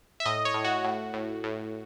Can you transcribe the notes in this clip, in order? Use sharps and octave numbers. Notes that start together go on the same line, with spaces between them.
E5
A2 D#5
C#5
A2
F#4
A2
A2
A2